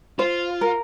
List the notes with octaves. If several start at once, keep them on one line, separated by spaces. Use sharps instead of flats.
F4 C5
A#4